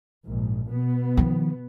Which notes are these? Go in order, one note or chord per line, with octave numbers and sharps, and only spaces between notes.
A#1 G#2
B2 B3
D#3 F3